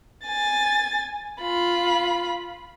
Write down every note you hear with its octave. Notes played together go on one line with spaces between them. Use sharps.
G#5 A6
F4 B5